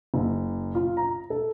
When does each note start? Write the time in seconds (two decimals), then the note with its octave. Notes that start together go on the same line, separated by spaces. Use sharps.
0.14 F#1
0.75 F4
0.97 A#5
1.30 A4